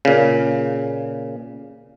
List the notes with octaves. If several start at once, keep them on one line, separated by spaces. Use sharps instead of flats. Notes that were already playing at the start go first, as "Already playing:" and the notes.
A#2 C#3